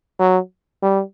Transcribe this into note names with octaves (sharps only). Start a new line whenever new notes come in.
F#3
G3